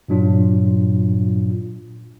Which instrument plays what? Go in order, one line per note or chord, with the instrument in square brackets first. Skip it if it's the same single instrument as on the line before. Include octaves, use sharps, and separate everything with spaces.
[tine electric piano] G2 A#2 F#3 D4 F4